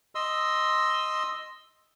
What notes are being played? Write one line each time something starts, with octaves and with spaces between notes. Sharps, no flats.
D#5 C6 E6